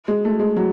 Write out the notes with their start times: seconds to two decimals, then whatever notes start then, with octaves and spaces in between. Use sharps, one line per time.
0.08 G#3
0.25 A3
0.40 G#3
0.56 F#3